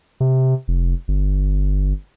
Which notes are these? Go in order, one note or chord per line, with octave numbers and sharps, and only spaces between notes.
C3
F1
G1